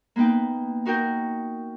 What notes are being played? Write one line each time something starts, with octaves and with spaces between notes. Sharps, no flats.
A#3 B3 D#4 B4 G5
D#4 F#4 A#4 G5 G6